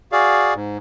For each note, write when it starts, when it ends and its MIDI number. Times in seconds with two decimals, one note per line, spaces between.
0.12 0.54 66
0.12 0.54 68
0.12 0.54 74
0.12 0.54 77
0.55 0.78 44